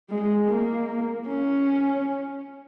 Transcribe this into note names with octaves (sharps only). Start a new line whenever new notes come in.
G#3
A#3
C#4